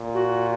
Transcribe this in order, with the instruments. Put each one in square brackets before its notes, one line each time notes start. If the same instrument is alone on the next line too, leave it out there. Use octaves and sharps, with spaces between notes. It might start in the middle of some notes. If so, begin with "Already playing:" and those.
Already playing: [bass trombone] A#2
[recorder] F#4